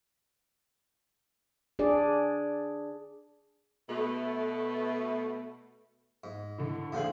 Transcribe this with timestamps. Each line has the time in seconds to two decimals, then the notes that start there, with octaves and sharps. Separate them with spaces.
1.79 D4 G#4 D5
3.89 B2 A3
6.24 G#2
6.58 A2 D3
6.92 E2 A2 C#3 D4 G#4 C5